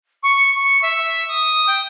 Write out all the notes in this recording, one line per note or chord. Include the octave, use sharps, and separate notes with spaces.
C#6
C#6
E5
D#6
G5